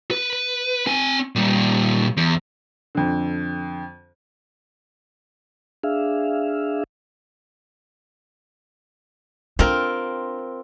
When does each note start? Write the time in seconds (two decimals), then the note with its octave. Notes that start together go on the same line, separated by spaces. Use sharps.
0.11 B4
0.87 C4 G#5
1.35 A#2 G3
2.17 E2
2.95 F2 D3
5.84 D4 G#4 E5 F5
9.59 C4 D4 F4 A#4